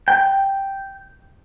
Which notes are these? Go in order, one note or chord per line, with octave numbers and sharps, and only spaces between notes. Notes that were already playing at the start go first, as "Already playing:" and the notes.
G5